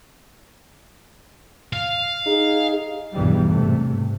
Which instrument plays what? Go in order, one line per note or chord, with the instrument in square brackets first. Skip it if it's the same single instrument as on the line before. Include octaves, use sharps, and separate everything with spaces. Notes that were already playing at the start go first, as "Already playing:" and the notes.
[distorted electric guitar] F5
[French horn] D#4 [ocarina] G#4
[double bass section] B1 E2 G2 D#3 E3 G3
G#2 C3 A3